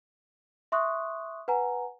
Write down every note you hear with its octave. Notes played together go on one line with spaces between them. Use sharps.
E5 C6 C#6 D#6 F#6
B4 F#5 G#5 A#5